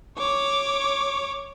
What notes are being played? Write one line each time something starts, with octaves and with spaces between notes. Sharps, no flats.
C#5 D6